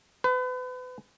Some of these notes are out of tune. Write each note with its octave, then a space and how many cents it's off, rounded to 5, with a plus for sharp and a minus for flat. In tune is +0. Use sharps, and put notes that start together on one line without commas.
B4 +35